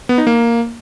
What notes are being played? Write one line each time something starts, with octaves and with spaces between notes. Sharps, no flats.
B3
D#4
A#3